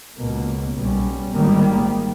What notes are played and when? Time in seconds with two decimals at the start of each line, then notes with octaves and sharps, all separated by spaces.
0.18 C#2 B2 A#3
0.75 B1 B2 G3 C#4
1.33 G#1 G#2 D#3 G3 A#3